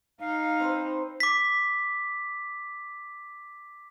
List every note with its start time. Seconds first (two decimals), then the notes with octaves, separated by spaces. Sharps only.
0.20 D#4 F5
0.60 C4 B4 C5
1.20 D6 B6